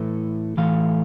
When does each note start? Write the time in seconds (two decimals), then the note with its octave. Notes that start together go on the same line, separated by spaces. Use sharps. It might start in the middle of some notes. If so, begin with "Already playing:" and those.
Already playing: A2 E3 A3
0.57 A2 E3 A3 F5